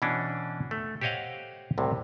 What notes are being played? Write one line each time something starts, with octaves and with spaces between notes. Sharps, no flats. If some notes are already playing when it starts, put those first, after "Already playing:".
B2 E3 C#4 D4
A3
G4 C5 C#5 D#5 F5 F#5
C2 A2 C3